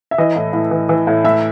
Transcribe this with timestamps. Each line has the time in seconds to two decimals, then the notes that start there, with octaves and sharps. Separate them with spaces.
0.11 E5
0.18 E3 D#5
0.36 A2
0.53 A2
0.71 E3
0.89 E3
1.07 A2
1.24 A2 E5